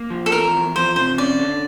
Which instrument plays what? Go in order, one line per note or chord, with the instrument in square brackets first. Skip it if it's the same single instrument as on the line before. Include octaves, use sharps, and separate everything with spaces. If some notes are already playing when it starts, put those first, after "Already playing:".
Already playing: [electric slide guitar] A#3
F3
[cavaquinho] A4
[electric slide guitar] E2 [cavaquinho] A#4
[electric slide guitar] E2
[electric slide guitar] F3 [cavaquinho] C5
[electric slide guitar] C3 [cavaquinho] C5
[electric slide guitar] C#4 [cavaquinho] D5
[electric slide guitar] D3